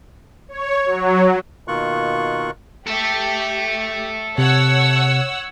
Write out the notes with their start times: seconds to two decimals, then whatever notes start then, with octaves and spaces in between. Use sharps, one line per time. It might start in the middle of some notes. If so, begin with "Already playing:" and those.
0.49 C#5
0.86 F#3
1.68 B2 D#3 A#3 F4 C#6 F#6
2.87 G4 A4 E5
4.38 C3 C#5 F#5 E6